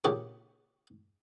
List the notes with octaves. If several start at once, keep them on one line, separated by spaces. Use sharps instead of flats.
A#1 A#2 C#3 G4 G#4 C#6